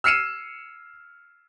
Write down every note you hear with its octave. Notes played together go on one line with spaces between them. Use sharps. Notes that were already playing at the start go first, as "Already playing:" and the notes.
E6 F6 C7 C#7 D#7 E7